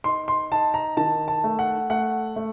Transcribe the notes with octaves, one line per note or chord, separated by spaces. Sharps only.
D#4 C6
C6
D#4 A5
A#5
D#3 A5
A5
A3
F#5
A3 F#5
A3